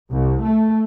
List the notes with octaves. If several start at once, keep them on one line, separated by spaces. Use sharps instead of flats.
C2
A3